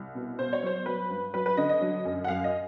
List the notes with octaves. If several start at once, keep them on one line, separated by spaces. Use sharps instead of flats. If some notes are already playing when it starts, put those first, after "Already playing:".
Already playing: C2
B2
B2 C5
C#5
F#3 C5
F#3 B4
G2
F#3 B4
B4
D3 D#5
D#5
F#3
F#2
F#5
F#2 F5
D#5